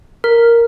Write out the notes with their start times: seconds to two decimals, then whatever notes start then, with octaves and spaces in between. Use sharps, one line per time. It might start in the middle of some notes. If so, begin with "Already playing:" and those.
0.24 A#4